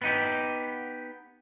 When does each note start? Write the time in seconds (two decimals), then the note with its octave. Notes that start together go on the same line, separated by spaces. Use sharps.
0.02 B3 D#4 G4